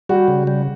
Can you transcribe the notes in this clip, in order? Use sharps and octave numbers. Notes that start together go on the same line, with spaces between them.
G3 F#4
C#3
G3